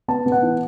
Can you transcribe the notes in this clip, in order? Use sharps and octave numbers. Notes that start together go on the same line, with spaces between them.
B3 A5
B3
F#5
E3